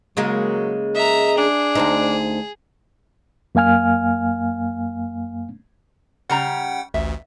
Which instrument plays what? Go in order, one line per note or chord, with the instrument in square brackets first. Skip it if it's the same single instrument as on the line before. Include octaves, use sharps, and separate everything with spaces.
[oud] C#3 G#3 A#3 [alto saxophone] F#3
[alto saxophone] D#5 [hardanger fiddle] E5 A#5
[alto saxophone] D4 [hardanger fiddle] G#4
[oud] D2 C4 D#4
[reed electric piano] F#2 A#3 F5 G#5 F6
[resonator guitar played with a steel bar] C#3 G3 A#5 [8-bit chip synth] F#5 G5
[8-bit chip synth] A1 D2 [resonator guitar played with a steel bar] E5